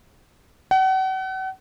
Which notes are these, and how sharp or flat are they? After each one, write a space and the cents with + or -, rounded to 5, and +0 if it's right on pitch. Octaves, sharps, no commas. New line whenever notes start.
F#5 +40